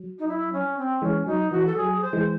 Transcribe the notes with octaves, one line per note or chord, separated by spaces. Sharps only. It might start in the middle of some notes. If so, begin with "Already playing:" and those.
Already playing: F#3
D#4
E4
C#4
C4
E3 G#3 C#4
F#3 D#4
E3 F#4
A4
F#3 G#4
C5
E3 G#3